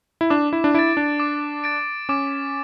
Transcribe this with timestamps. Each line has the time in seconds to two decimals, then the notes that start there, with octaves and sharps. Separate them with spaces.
0.21 E4
0.30 D4 D6
0.53 E4
0.64 D4
0.74 E4 A6 D7
0.97 D4
1.20 D6
1.64 A6 D7
2.09 C#4 D6